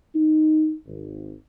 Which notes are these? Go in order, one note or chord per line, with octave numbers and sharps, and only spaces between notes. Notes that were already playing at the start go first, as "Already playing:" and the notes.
D#4
G#1